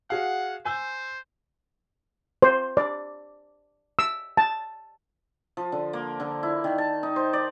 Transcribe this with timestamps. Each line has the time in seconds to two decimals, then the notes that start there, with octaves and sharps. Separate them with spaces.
0.10 F#4 G#4 F5 F#5
0.65 C5 G#5 E6 G6
2.42 C5
2.77 D5
3.99 E6
4.37 A5
5.57 F3
5.72 D3
5.93 A#3
6.20 D3
6.43 E4
6.64 D#3
6.78 A5
7.03 D#4
7.16 C5
7.33 D5